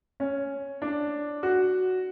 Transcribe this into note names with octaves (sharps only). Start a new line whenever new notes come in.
C#4
D4
F#4